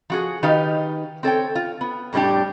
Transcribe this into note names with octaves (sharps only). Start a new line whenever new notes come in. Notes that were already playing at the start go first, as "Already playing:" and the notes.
F3 F#4 G#4
D#3 D#4 G4 B4 F5
C4 A4 C#5 G5
F4
B3
F2 A2 G3 D4 G4